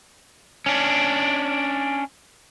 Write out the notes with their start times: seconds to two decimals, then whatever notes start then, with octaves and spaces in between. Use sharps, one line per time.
0.66 C#4 D4